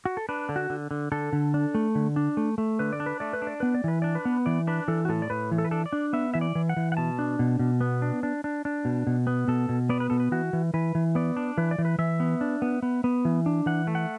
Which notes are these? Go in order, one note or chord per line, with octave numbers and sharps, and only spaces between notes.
F#4
A4
D4 B4
D3
F#4
D3
D3
D3 A4
D3
D4
A3
D3
D4
A3
A3
D3 B4
D5
D4
B4
A3 D5
B4
D4
D5
B3 B4
D5
E3 B4
D4 D5
B4
B3
E3 D5
D4 B4
E3 A4
F#4
A2 A4
D5
A2 B4
E3
A4
B4
D4 A4
D5
D4
B3 E5
E3 E5
D5
E3
F#5
E3
F#5
B2 A5
D4
B2
B2
B3
D4
D4
D4
D4
B2
B2
B3
B2 A4
B2
B3 D5
B4
B2 A4
B4
E3 F#4
E3
E3 B4
E3
B3 D5
D4
E3 B4
D5
E3
B4
E3 E5
B3
D4
B3
B3
B3
E3
D4
E3 F#5
A3
F#5